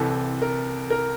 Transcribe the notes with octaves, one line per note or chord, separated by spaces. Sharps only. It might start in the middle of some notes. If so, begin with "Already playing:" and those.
Already playing: C2 C3 E3 A4
A#4
A#4